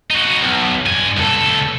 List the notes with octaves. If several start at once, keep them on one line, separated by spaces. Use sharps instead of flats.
D#4 F#4
B1
G2 G#5
C#2 A4